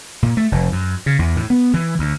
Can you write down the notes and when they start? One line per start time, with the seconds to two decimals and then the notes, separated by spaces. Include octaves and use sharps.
0.23 A#2
0.37 A3
0.52 F1
0.72 F#2
1.06 C#3
1.19 E2
1.37 A2
1.50 B3
1.74 E3
1.99 D2